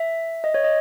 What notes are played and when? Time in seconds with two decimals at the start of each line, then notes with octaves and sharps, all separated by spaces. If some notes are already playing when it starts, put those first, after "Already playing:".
Already playing: E5
0.44 D#5
0.54 C#5
0.64 D#5